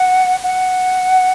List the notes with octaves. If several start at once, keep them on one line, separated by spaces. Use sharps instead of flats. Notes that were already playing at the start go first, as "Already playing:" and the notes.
Already playing: F#5
F#5